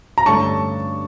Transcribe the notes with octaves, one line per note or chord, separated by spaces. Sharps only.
A#5
G2 D3 A3 C#4 A5 C#6